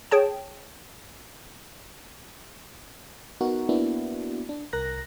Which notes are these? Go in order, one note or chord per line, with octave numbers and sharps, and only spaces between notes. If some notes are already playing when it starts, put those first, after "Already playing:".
G#4 C#5 G5 A5
B3 D#4 F#4 A#4
A#3 B3 D4 E4 F#4
D4
C2 A#4 F#6 A#6